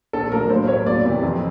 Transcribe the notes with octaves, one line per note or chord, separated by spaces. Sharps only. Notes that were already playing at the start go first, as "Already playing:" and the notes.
A#1 A4
A#2 F#3 A#3 D4 A#4
A2 C5
F#3 C#5
A#3
E2 D5
C3 E3
F2